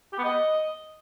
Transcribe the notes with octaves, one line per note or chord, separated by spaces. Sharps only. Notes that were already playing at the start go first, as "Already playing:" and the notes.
G4
B3
D#5